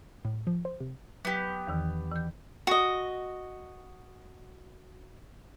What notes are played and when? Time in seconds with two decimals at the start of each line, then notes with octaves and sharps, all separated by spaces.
0.25 A2
0.47 F3
0.65 C5
0.80 C3
1.25 F#3 B3 G4
1.67 E2 D#3 E3
2.11 E3 G6
2.67 F#4 D#5